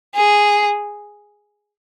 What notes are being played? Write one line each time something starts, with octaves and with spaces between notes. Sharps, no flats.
G#4